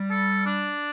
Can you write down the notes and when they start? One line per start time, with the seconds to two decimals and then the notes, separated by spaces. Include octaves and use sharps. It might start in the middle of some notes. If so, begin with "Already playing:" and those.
Already playing: G3
0.10 A4
0.46 D4